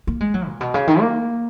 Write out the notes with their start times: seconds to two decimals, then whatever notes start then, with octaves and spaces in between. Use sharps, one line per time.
0.07 A#3
0.21 G#3
0.34 F#3
0.48 A#2
0.61 B2
0.74 C#3
0.88 D#3
1.00 A#3